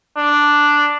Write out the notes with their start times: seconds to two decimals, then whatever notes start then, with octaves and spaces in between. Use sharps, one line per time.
0.17 D4